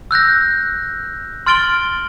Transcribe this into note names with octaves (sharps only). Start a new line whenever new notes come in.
E6 F#6 G6 A#6
C6 F6 A6 D7 F#7 G7